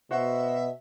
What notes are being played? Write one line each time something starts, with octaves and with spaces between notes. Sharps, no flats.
B2 F#4 C5 E5 F#5